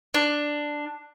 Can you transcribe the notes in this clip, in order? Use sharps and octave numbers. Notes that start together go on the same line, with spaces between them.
D4